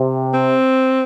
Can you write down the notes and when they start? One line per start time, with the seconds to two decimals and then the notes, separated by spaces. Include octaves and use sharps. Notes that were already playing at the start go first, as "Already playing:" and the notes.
Already playing: C3
0.34 C4